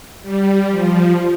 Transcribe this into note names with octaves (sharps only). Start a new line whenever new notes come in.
G3
F3